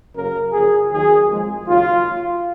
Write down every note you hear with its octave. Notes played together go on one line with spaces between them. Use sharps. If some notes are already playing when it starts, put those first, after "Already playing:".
F#2 C#3 F#3 A#3 A#4
F#2 C#3 F3 G#4
D#2 D#3 F#3 G#4
F2 F3 G#3
D#2 C#3 F#3 F4